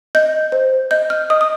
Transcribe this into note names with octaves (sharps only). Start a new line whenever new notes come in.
D#5 G6
C5
D#5 G6
F6
D#5 D#6
D#6